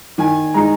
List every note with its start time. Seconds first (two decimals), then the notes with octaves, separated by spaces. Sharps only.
0.18 D#3 G#5
0.54 G#3 D#4 A#5